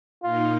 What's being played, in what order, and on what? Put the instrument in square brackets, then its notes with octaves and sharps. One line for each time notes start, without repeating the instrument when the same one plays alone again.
[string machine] A#2 A#3 D#4 [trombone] F4